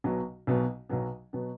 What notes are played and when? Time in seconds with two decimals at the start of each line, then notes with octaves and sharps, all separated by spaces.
0.04 B1 B2 F#3 B3
0.47 B1 B2 F#3 B3
0.89 B1 B2 F#3 B3
1.33 B2 F#3 B3